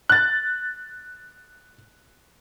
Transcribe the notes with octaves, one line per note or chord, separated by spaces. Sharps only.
F#6 A6